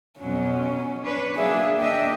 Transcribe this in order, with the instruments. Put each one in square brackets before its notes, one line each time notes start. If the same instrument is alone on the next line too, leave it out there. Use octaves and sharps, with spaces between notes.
[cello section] F2 B2 F#3 [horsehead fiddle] C#4
[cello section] D4 B4 C#5
[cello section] F#3 A#3 D4 [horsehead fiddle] G#4 E5
[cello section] D#2 D4 E5 [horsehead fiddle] D#5 G5